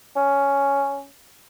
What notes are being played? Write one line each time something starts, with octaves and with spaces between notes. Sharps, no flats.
C#4